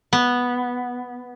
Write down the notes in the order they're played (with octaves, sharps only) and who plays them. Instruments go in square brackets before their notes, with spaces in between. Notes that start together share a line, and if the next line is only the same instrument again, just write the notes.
[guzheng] B3